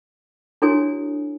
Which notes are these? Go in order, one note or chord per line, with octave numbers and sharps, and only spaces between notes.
D4 E4 F#4 A4 C#5 G#5